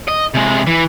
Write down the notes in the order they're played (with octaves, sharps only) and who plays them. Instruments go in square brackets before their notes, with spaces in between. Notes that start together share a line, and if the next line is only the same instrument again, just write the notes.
[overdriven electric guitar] D#5
C3 G#3
E3